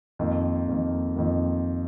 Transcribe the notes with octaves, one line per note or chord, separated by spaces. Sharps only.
F2 D#3 A#3
F2 D#3 A#3
F2 D#3 A#3